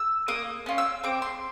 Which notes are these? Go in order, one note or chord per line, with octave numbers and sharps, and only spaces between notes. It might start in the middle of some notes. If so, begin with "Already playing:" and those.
Already playing: E6
A#3 D#6
C#4 F4
E6
C4 D6
C6